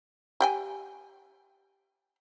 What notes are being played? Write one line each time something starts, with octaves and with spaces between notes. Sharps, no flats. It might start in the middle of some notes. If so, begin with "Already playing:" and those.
G4 G5 G#5